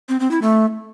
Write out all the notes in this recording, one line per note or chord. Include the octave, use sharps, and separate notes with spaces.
C4
C4
E4
A3